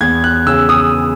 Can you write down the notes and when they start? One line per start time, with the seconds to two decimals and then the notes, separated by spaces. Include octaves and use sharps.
0.01 E2 G#6
0.24 F#6
0.46 C#3 E6
0.69 D#6